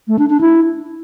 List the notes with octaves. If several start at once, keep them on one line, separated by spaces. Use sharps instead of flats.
A3
D4
D4
E4